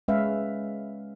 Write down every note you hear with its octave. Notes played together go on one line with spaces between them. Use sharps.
G#3 C#4 B4 E5 F5